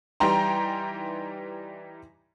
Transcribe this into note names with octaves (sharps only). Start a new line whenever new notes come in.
E3 G3 D#4 G5 A#5 C6